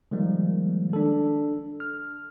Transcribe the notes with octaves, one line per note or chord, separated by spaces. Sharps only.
D#3 F3 G3 G#3 A#3
D4 A4
F6